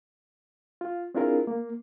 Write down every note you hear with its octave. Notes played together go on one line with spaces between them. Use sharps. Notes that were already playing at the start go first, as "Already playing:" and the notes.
F4
C4 D4 E4 F4 G#4 A#4
A#3